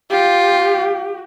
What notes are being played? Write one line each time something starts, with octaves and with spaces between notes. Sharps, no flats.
F4 G4